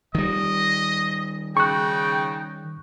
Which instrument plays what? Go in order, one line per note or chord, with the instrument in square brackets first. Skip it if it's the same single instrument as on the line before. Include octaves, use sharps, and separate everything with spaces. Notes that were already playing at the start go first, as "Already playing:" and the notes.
[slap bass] D#3 G3 [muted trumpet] D#5
[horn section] C#3 G5 [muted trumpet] D#4 [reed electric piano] C#6 F#6